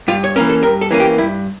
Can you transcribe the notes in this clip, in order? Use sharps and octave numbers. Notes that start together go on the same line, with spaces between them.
G2 F4
C#5
E3 A#3 C#4 A#4
A4
G2 A#4
A4
E3 A#3 C#4
G4
G2 E4